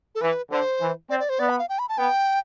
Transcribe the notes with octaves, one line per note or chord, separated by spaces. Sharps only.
A4
E3 B4
D3 C5
E3
C4 D5
D5
C5
B3 D5
B5
F5
G5
B5
A5
B3 G5